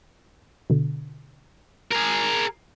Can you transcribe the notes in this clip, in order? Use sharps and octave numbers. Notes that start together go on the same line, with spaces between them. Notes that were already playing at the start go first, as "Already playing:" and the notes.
B2 D3
G#4 A#4